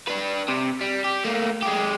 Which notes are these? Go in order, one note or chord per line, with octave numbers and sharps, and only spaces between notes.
D4 B4
C3
G3
G4
A3 A#3
G#3 G4